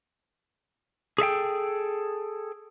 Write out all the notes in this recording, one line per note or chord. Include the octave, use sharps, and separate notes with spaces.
G#4 A4 E5 G5